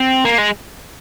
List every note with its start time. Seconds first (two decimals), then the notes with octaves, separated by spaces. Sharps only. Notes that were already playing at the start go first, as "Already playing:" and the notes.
Already playing: C4
0.25 A#3
0.38 G#3